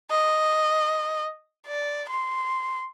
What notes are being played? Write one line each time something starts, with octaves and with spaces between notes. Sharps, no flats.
D#5
D5
C6